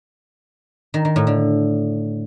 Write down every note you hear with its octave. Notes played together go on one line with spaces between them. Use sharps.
D#3
D#3
A2
D3